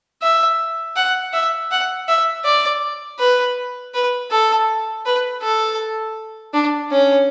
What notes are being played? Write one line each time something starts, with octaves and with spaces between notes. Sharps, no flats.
E5
F#5
E5
F#5
E5
D5
B4
B4
A4
B4
A4
D4
C#4